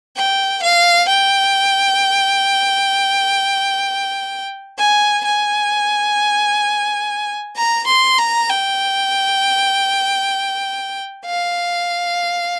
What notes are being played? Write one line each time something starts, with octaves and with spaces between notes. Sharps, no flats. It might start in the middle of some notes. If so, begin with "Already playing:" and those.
G5
F5
G5
G#5
G#5
A#5
C6
A#5
G5
F5